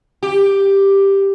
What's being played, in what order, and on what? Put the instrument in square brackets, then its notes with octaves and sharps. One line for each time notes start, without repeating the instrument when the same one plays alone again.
[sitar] G4